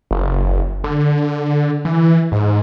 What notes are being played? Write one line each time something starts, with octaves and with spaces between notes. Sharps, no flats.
F#1
D3
E3
G#2